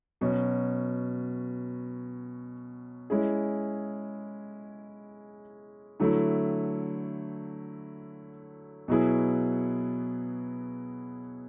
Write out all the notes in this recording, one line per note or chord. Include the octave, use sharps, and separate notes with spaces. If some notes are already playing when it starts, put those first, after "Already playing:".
B2 F#3 C#4
G#3 C#4 E4 G#4
D3 F#3 A3 E4
B2 F#3 B3 E4 G#4